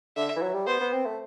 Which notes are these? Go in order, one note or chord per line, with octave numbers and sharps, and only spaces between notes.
D3 E5
E3
F#3
G3
B3 C5
B3
C4
A3